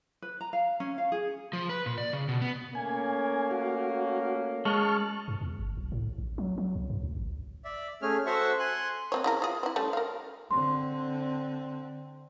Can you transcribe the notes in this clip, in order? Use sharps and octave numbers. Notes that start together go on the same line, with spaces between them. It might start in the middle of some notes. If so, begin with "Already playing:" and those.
B4
A#5
F5
C#4
F5
G#4
F3
B4
A#2
D5
C#3
B2
B3
A3 A#3 C#4 G#5
F#4
G#3 A5 C#6 F6
G2
E2
G1
B1
A2
A#1
F#3
F#3
C#2
G2
D2
A1
D5 E5
A3 C#4 G#4 F6
F#4 A4 C5 E5 F#5 C#6
G#5 C6 F#6
A#3 C4 C#5
C#3 E4 A#4
F4 G#4
C4 E4
G3 A3 C#4
A#4 F5
D3 C4 C6